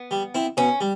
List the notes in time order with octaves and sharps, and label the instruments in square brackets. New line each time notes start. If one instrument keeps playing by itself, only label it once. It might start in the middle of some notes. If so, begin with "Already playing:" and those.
Already playing: [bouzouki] B3
[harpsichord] G3
C4 E4
[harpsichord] B2 [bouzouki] C#4
[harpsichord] G3